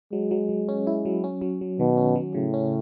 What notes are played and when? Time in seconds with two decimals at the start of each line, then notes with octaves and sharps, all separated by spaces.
0.13 F#3 G#3
0.31 F#3
0.49 F#3
0.69 C#4
0.87 E4
1.05 F#3
1.24 C#4
1.41 F#3
1.61 F#3
1.80 B2 D#3
1.97 C#4
2.15 F#3
2.34 A2 C#3
2.54 C#4